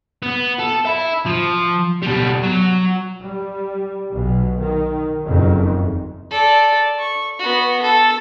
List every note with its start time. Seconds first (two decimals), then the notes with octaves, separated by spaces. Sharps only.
0.23 B3
0.59 A4
0.85 E5 B5
1.26 F3
2.03 B2 G3
2.43 F#3
3.20 G3
4.12 B1 B2
4.60 D#3
5.24 F#1 F2 D#3
6.31 A4 D5
6.99 C#6
7.39 B3 F#4
7.82 A4